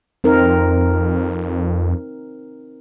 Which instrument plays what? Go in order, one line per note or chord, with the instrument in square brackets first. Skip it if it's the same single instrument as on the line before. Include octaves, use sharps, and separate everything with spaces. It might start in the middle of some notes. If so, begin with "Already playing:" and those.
[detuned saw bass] F2 [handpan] C4 D#4 A#4